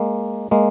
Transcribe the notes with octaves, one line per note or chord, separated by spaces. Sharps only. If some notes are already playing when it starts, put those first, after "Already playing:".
Already playing: G#3 A#3
G#3 A#3